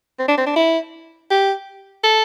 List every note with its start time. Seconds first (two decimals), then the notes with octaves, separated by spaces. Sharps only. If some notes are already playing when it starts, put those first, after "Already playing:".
0.19 C4
0.28 D4
0.38 C4
0.46 D4
0.56 E4
1.31 G4
2.04 A4